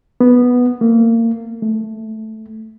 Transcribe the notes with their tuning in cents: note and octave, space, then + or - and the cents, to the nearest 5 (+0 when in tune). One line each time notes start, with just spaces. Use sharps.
B3 -5
A#3 -30
A3 -5